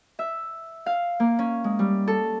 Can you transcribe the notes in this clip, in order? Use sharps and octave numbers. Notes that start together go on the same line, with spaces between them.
E5
F5
A#3
C#4
G#3
G3
A4